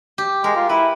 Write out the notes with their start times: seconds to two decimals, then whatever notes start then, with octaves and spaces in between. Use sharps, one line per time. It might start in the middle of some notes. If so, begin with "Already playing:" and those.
0.18 G4
0.44 G#3 A#4
0.56 F4
0.69 E4 B4